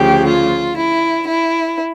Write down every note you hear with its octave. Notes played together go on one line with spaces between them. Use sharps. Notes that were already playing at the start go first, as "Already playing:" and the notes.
Already playing: D2 C#3 F3 G4
F4
E4
E4